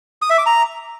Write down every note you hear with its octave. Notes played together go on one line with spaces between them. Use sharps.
D#6
E5
D6
A#5